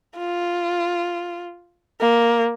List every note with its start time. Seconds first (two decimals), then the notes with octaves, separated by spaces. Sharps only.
0.18 F4
2.00 A#3